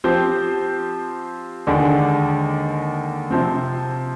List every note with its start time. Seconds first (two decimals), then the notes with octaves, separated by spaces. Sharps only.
0.04 F3 C4 G4 C5
1.67 D#2 D3 G#3 D4
3.31 C3 F3 C4